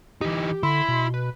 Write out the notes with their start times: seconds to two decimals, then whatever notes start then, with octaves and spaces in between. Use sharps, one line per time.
0.21 E3 D#4 G4
0.63 D3 E4 B5 C6
0.89 B2
1.14 B4